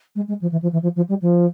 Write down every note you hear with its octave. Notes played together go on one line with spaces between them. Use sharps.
G#3
G#3
F3
E3
F3
E3
F3
F3
G3
F3